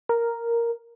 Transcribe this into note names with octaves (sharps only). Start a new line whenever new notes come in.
A#4